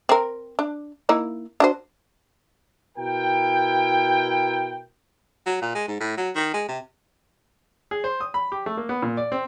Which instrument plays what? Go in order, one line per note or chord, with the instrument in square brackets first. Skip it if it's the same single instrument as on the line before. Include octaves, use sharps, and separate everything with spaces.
[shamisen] C4 A#4
D4
A#3 D#4 E4
D4 F#4 C5
[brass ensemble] B2 E4 A#4 G5
[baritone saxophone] F#3
A#2
G#3
G#2
A2
F#3
D#3
G#3
C3
[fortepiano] G#4
C5
D#6
B5
G4
A3
A#3
B3
A#2
D5
C4